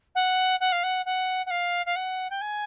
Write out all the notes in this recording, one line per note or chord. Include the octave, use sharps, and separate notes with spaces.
F#5
F#5
F5
F#5
F#5
F#5
F5
F5
F#5
G5
G#5